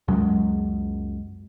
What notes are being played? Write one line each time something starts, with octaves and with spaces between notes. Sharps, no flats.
C#2 F#2 F#3 G#3